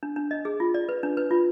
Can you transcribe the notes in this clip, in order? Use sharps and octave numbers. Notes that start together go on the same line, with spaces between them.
D4
D4
D#5
G#4
F4
D5
B4
D4
B4
F4